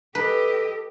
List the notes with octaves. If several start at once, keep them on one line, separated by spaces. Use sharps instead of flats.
G4 A4 B4 D#5